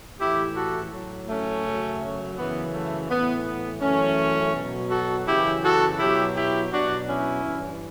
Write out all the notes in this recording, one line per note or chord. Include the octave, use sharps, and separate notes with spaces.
A2 E3 E4 G4
F#4 A4
A2 F#3
A3 C#4
F#2 C#3 F#3
F#2 C#3 E3 B3
A3
A2 E3 B3
B3
F#2 E3 A3 C#4
B2 F#3
F#4 A4
F#2 C#3 E3 E4 G4
F#4 A4
B2 F#3 E4 G4
E4 G4
B2 F#3 D4 F#4
C#4 E4
G2 E3